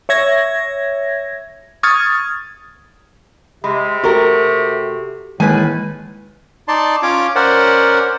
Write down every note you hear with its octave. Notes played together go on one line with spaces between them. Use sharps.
C#5 E5 G#6 A#6
C#6 D#6 F6 G#6 A6
C3 G#3 B5
A3 F#4 G4 A4 A#4
A2 D#3 E3 G#3 A#3 B4 G#5
D#4 D5 A5 C6
C#4 F4 C#5 D6
C#4 A#4 C5 D5 F#5